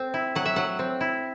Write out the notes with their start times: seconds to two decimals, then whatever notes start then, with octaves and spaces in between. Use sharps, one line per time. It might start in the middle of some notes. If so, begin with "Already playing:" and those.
Already playing: C4
0.14 E4
0.35 F#3 F#5
0.46 E5
0.56 F#3 F#5
0.79 C4
1.01 E4